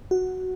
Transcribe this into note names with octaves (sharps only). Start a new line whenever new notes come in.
F#4